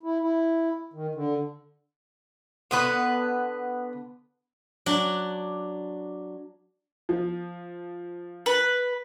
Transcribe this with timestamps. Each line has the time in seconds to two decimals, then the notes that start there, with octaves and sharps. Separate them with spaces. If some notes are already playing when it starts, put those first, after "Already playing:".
0.03 E4
0.21 E4
0.93 D#3
1.15 D3
2.71 D3 B3 B4
4.86 F#3 D4
7.09 F3
8.46 B4